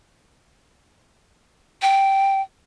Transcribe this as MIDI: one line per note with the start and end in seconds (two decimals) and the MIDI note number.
1.82 2.41 79